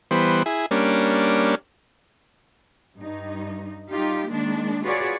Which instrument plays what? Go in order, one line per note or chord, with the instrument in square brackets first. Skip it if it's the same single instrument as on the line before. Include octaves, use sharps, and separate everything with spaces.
[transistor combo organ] E3 G3 B3 C5
E4 G#4
G3 A#3 C#4 D4
[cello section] G2 D#4
G3 D#4 F4 G4
D#3 G#3 A#3 D4
F4 F#4 G#4 B4 C#5 D5